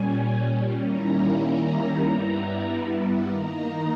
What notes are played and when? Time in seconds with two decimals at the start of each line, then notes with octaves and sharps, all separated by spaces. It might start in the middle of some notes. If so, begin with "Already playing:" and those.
Already playing: A#2 G3 C#4 G#5
0.82 D#3 G3 A#3 C#4 E4 A#5
1.44 A#5
2.05 G2 G3 B3 E4
3.27 D#3 A#3 D#4 A#5